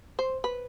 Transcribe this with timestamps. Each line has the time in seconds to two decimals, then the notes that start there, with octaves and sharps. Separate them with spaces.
0.19 C5
0.44 B4